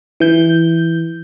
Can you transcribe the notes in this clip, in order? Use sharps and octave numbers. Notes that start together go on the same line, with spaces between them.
E3 G6